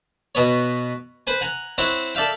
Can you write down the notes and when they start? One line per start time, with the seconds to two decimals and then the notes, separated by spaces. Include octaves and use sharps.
0.35 B2 B3 C#5
1.27 B4 C5 G#5
1.41 F#5 G#5 A#5
1.78 C4 E4 C#5 F#5
2.15 A4 D5 E5 F5 G5